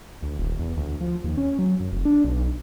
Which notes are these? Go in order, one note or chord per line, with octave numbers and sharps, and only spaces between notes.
D2
D#1
E2
D2
F3
D#2
C#4
F#3
F#2
F1
D4
B1